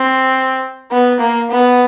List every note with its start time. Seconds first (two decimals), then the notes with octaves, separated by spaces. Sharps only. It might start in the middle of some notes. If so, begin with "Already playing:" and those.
Already playing: C4
0.91 B3
1.20 A#3
1.51 B3